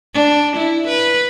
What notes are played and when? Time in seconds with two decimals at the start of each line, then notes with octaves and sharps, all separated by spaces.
0.14 D4
0.56 E4
0.88 B4